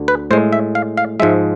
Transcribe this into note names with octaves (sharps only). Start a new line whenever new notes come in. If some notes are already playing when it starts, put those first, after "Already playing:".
Already playing: D2 D3
B4
A2 G#3 C5
E5
F5
F5
G#2 F3 G#3 E5